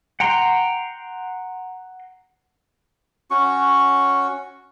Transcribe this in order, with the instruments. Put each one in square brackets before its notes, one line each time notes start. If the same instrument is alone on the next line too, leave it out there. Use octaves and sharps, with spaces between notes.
[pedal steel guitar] F#5 G5 A#5 C6
[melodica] C#4 F#4 C#6